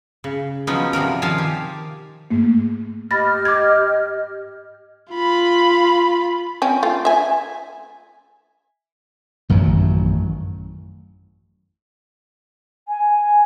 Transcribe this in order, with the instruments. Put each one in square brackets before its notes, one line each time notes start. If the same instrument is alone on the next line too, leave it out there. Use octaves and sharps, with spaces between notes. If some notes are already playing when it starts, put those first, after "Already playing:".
[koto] C#3
F3 F#3 B3 C#4 D#4
C3 F3 G3 A#4
D#3 F3 F5 G#5 A5
G4
[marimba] G#2 A3 A#3
[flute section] G4 D#5 F6 [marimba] B5 A6 A#6
[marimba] D6 G#6
[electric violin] F4 B5
[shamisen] C4 C#4 G5
A3 F4
E5 G#5
[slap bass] A1 F#2 D#3 F#3
[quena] G#5